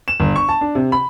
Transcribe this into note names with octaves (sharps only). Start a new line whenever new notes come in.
E7
G1
C#6
A5
D4
C3
B5